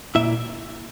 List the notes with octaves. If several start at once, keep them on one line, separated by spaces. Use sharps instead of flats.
A#2 A#3 E4 E5